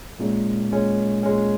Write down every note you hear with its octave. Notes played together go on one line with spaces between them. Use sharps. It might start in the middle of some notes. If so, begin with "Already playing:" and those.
A#2 G#3 C#4
A#2 G#3 C#4
A#2 G#3 C#4